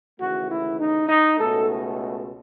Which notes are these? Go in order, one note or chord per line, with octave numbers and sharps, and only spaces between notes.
D#2 C#3 E3 A3 F#4
E4
D#4
D#4
C#2 B2 A3 A4